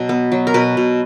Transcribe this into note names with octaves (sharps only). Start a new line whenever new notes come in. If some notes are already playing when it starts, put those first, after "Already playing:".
Already playing: B2 F#3
B3
F#3
A#4
B2 B4
B2